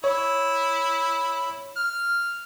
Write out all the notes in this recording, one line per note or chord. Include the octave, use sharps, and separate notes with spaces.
E4 C#5
F6